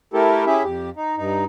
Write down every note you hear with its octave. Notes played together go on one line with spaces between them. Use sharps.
A3 E4 G4 A4 A#4
C#4 E4 G4 G#4 E5
F2 G4
D#4
G2 D#4